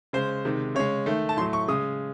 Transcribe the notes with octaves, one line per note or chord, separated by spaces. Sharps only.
C#3 G#3 C5
C3 D#3 G#3
C#3 G#3 C#5
D#3 A3
A5
A2 F#3 A3 C6
C#6
C#3 G#3 D#6